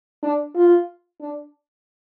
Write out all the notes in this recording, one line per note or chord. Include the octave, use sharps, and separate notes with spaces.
D4
F4
D4